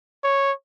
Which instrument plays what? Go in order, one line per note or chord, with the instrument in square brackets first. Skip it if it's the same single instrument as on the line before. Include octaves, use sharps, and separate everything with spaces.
[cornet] C#5